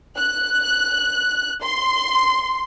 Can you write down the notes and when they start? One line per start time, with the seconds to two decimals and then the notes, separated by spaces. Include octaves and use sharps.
0.16 F#6
1.62 C6